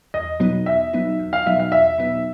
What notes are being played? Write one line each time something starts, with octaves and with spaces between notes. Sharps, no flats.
E2 D#5
B2 F#3 B3 D#4
E2 E5
B2 F#3 B3 D#4
E2
F5
B2 F#3 B3 D#4 E5
F5
E2 E5
B2 F#3 B3 D#4